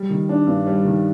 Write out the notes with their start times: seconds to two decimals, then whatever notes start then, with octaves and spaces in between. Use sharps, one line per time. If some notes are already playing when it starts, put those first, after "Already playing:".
Already playing: G3
0.10 D#3
0.29 D4
0.47 G2
0.67 G3
0.85 D#3